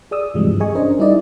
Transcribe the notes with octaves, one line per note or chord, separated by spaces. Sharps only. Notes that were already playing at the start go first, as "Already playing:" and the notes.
G#4 D5 D#6 E6
G2 C3 E3 F3 G3 G#3
G2
G#4 D#5 G#5 C#6
C#4 D4 A#4 C5 D#5
G3 D#4 E4 D5 D#5